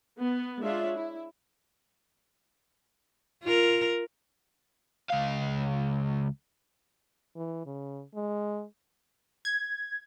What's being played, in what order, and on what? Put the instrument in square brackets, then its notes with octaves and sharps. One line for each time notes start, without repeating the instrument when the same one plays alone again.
[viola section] B3
G#3 D4 F4 C#5 E5
E4
[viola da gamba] F4 A#4
[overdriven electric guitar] C#2 F5
[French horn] E3
C#3
G#3
[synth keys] G#6